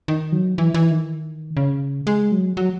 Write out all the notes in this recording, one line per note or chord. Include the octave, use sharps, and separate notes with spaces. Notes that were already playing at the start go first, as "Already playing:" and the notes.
D#3
F#3
E3
E3
D#3
C#3
G#3
F#3
F#3